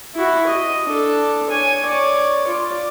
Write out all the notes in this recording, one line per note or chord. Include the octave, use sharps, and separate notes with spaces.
E4 F#4
D#5
D4 A4
C#5 G#5
C#5 D5
F4 D5